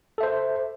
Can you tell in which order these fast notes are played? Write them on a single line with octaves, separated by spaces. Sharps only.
A4 E5 C5